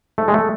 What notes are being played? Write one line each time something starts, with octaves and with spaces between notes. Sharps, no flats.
G#2 A3
G#3
A3